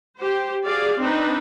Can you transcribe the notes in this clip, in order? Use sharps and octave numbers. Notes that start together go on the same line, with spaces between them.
G4 C5
F#4 G#4 D5 F5
C4 D4 D#4 B4